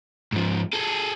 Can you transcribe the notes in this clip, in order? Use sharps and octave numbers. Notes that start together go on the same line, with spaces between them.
G#2 F3
G#4 A4